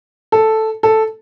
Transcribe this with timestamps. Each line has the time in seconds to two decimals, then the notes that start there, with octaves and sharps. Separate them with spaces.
0.32 A4
0.83 A4